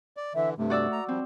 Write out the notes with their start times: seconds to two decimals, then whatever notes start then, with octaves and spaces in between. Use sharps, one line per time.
0.17 D5
0.35 D3 E3 E5
0.58 G2 C3 A3
0.70 F#4 D5 E6
0.92 A#5
1.08 F3 G3 C4